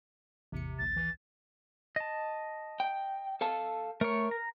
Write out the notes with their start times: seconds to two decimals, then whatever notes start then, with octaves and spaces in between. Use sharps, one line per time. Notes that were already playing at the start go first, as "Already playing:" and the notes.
0.52 A1 E2 C3 C#7
0.79 A#1 D#2 A6
0.96 E3
1.96 D#5 A5
2.80 G5
3.41 A4 F5 A5
4.01 A3 A#4 C#5
4.31 A#5